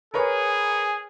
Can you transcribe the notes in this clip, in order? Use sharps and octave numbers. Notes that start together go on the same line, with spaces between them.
G#4 A#4 B4 C#5